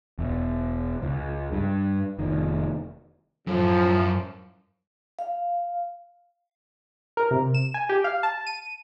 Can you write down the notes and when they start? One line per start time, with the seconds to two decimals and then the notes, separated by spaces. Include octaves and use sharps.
0.19 E1 E2
1.02 C#2
1.52 G2
2.18 F1 D#3
3.47 F#2 A2 F3
5.19 F5
7.17 A#4
7.31 C3
7.54 E7
7.74 G#5
7.89 G4
8.04 F5
8.23 A5
8.47 D#7